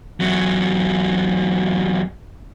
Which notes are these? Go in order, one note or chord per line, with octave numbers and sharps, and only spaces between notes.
E2 F#3